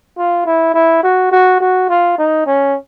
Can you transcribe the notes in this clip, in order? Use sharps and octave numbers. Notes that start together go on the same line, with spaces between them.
F4
E4
E4
F#4
F#4
F#4
F4
D#4
C#4